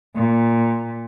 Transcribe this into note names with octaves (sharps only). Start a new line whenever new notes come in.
A#2